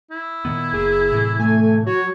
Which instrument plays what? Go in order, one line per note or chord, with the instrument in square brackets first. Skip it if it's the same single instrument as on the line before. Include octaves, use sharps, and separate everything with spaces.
[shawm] E4
[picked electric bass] A#2 D#3 B3
[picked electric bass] F#1 A#3 [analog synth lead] G#4
[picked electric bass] A2 C3 E3
[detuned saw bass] A3 [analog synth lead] G#5
[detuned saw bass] F#3 [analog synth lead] F#4 [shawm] C#5